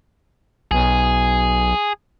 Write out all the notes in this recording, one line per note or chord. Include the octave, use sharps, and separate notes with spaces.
B1 G#4